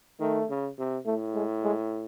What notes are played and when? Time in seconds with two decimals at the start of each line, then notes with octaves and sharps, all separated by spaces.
0.20 D#3 A3
0.49 C#3
0.78 C3
1.06 A2 A3
1.35 G#3
1.63 G#3